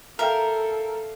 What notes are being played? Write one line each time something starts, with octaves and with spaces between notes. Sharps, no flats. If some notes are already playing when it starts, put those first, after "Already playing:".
A4 A#4 E5 F5 G5